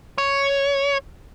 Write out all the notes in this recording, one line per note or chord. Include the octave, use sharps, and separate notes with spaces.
C#5